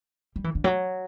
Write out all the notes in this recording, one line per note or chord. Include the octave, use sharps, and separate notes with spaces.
G3
E3
D3
F#3